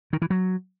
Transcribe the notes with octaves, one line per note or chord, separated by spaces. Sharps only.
D#3
E3
F#3